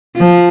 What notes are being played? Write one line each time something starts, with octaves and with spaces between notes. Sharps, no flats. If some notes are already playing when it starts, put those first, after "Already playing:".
F3